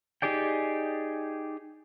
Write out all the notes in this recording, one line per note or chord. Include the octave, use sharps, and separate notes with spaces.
D#4 G4 G#4 D5 G5